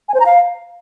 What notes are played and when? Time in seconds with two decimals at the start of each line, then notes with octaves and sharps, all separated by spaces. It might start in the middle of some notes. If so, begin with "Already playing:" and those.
0.09 G#5
0.14 C5
0.20 A#5
0.26 F5